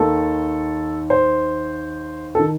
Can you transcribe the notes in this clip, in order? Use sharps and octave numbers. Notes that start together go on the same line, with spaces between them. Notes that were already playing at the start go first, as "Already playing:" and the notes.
Already playing: D#2 D#3 A4
C5
A4
D#3